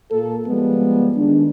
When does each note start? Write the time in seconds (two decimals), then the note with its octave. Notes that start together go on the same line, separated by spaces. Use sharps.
0.12 A#2 A#3 A4
0.48 F3 G3 G#3 B3
1.17 D#3 G#3 D4